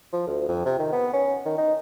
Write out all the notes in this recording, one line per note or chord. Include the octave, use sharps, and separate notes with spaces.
F3
D2
F2
C3
D#3
B3
C#4
D#3
D#4